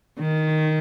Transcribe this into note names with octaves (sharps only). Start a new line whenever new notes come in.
D#3